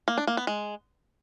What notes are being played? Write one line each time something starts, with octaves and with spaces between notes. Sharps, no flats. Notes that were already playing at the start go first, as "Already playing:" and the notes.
A#3
D4
A#3
B3
G#3